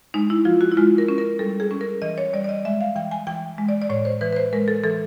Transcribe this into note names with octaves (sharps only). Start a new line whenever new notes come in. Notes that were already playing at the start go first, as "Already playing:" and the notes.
G#3 D#4
E4
F3 F4
F#4
E4
G#3 F4
A#4
C#4
A#4
G3 A4
G#4
C#4
A#4
E3 D#5
C#5
G3 D5
D5
D#5
G#3 E5
F5
E3 G5
G#5
E3 G5
G#3
D5
D5
A2 C#5
C5
E3 B4
B4
C5
G#3 A#4
A4
E3 A4